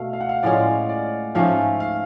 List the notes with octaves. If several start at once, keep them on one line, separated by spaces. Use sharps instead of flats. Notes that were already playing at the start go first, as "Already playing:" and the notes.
Already playing: B2 A3 F5
F5
F#5
F5
A2 G#3 C#4 F4 D5
D5
G#2 F3 A3 C#4 F5
F5